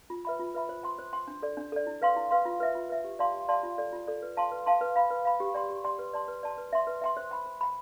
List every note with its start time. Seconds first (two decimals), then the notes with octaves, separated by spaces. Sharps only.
0.10 F4
0.25 B4 E5 B5
0.40 F4
0.54 B4 E5 B5
0.69 C5
0.83 G5 C6
0.99 C5
1.13 G5 C6
1.28 D4
1.43 A4 D5
1.57 D4
1.72 A4 D5
1.87 E4
2.02 B4 F5 C6
2.16 E4
2.31 B4 F5 C6
2.45 F4
2.60 B4 E5
2.75 F4
2.89 B4 E5
3.04 G4
3.19 D5 F5 A5 C6
3.34 G4
3.49 D5 F5 A5 C6
3.63 F4
3.78 A4 D5
3.93 F4
4.07 A4 D5
4.22 B4
4.37 F5 A5 C6
4.51 B4
4.66 F5 A5 C6
4.81 B4
4.96 F5 B5
5.10 B4
5.25 F5 B5
5.40 G4
5.54 D5 G5 C6
5.69 G4
5.84 D5 G5 C6
5.99 B4
6.13 D5 A5 C6
6.28 B4
6.43 D5 A5 C6
6.58 B4
6.73 E5 G5 C6
6.87 B4
7.02 E5 G5 C6
7.17 C5
7.31 G5 B5
7.46 C5
7.61 G5 B5